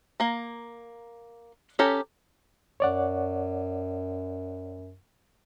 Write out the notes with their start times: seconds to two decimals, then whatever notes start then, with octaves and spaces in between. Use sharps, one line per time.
0.20 A#3 A#5
1.79 C#4 G4 A4 A#5
2.80 F#2 C#5 D5 F#5